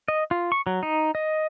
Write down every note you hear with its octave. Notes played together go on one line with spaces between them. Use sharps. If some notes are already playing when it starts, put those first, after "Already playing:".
D#5
F4
C#6
F#3
D#4
D#5